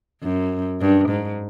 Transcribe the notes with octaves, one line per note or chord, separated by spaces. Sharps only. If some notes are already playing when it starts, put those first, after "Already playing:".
F#2
G2
G#2